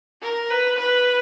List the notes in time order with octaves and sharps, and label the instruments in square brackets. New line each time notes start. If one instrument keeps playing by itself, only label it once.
[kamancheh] A#4
B4
B4